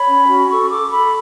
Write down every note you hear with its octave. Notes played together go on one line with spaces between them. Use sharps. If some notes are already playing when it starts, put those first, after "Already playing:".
Already playing: C#5 B5
C#4
F#4
A4 C#6
A4 D6
A4 B5